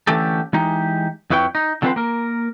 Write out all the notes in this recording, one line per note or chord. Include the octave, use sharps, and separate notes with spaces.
D3 E3 A3 C#4 G4 A4
E3 G#3 D#4 G4
F2 E4 B4 C#5 G5
D#4
D3 F3 C4 E4 B4 C5
A#3 A#4